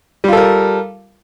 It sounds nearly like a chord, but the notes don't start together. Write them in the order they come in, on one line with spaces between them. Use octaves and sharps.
G3 F4 A4 A#4